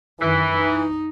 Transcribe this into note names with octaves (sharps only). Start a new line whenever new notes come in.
F#2 D#3 E3
D#4